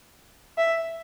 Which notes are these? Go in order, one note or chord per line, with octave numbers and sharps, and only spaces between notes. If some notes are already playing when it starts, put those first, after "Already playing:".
E5